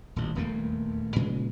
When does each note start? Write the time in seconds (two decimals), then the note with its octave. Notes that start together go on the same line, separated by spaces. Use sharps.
0.16 D#1 A1
0.35 D#1 E2 A3 A#3
1.16 A#2 C#3 E3 G#3